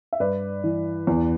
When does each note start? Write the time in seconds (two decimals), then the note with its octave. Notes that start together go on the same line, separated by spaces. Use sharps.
0.13 E5
0.20 G2 B4 D5
0.64 E3
1.07 E2